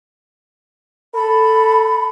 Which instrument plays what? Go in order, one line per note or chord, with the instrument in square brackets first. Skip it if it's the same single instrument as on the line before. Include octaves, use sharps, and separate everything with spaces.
[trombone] A4 [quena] B5